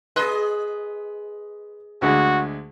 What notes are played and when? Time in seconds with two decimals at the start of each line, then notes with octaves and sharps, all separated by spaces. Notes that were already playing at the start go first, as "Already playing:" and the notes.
0.16 G#4 B4 D#5 C6 F#6
2.02 D2 D3 G#3 F#4